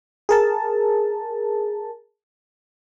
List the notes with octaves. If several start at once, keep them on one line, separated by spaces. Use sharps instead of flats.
G#4 A#4 A5